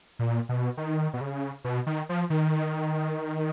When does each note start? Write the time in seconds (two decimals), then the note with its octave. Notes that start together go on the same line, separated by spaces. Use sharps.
0.19 A#2
0.49 B2
0.77 D#3
1.14 B2
1.21 C#3
1.64 B2
1.87 D#3
2.09 F3
2.30 D#3